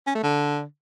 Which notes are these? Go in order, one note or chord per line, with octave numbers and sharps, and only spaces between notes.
C#4
A3
D3